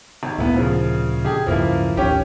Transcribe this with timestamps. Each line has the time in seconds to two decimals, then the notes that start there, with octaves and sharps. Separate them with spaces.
0.23 G#1
0.38 D2 A#2 A#3 B3 E4
0.56 C#3 F3
1.25 D3 G4 G#4
1.47 D1 G2 C#3 F3 A#3 E4
1.97 A1 D#2 C#4 G4